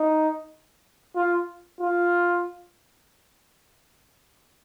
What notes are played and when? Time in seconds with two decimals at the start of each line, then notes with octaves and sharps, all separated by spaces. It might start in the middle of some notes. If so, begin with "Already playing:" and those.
Already playing: D#4
1.16 F4
1.81 F4